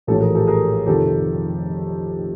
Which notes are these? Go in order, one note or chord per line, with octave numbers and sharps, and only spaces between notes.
A#1 A2 E3 G4 A4
G#4 A#4
G4 A4
G#4 A#4
F1 F2 C3 D#3 G4 A4